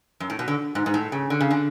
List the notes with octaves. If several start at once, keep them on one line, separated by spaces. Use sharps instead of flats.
F#2
A2
B2
D3
G#2
G#2
A2
C#3
D3
C#3
D3